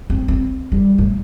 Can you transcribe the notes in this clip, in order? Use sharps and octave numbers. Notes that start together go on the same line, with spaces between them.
C4
C4
G3
A2